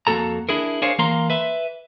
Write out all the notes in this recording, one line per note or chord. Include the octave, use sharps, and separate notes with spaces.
F2 A#3 F#4 A4 A#5
D4 E4 G#4 A#4
D4 G#4 A#4 C5 C#5 F5
E3 A#3 A#4 F5 A#5 C6
B4 E5